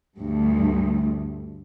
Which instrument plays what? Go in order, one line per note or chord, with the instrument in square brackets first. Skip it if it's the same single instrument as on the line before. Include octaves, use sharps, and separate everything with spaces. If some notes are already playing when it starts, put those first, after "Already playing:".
[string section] D2 G2